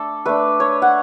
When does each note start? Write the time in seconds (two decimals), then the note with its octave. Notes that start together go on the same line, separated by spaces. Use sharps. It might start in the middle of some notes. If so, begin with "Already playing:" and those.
Already playing: A3 D4 A4
0.26 A3 D4 B4
0.60 C#5
0.82 F#5